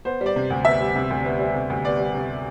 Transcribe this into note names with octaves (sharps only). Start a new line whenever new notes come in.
B3 C5
G3
D5
C3
D2
B3 E5
G3
C3
D2
B3
G3
C3
D2
B3 D5
G3
C3